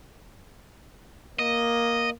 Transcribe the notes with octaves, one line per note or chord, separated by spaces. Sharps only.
A#3 D#5